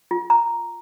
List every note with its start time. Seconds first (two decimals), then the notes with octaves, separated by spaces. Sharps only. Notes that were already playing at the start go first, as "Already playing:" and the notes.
0.11 F4
0.30 A#5